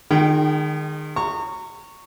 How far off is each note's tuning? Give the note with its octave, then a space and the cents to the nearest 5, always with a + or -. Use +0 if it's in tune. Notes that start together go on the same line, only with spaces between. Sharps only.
D#3 -30 G#3 -10 G5 -15
A#5 -30 C#6 +0